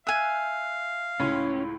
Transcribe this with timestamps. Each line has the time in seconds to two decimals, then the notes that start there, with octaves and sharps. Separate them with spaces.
0.07 E5 F5 G#5 F#6
1.20 C#2 A2 C#4 C6